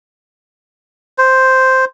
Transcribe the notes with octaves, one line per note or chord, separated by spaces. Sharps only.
C5